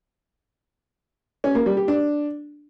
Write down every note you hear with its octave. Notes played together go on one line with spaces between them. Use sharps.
C#4
A#3
G3
G4
D4